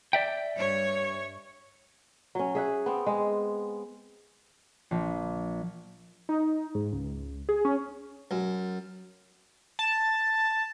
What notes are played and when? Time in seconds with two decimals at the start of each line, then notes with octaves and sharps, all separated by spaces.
0.13 D5 E5 G5
0.56 G2 C#5
2.35 F#3 C#4
2.55 G#4 E5 F#5
2.86 B3 C4
3.06 G#3
4.91 A#1
6.29 D#4
6.75 G#2
6.93 C#2
7.49 G#4
7.65 C#4
8.31 F#2
9.79 A5